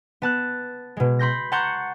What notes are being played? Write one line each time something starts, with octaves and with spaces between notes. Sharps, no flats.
B3 A5 F#6
B2 G#3
B5 C6 G6 A#6
F#5 A5 A#5 C6 C#6 G6